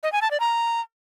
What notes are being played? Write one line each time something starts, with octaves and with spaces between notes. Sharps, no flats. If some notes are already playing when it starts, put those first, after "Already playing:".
D#5
G#5
A5
D5
A#5